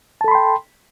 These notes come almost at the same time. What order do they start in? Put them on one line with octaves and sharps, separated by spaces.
A5 A4 B5 C6 G5